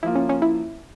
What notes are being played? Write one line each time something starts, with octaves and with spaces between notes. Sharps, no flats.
F3 A#3 E4 F4
C#4
C#4
E4